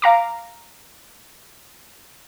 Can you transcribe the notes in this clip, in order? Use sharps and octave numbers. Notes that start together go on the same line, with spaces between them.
F5 A#5 D6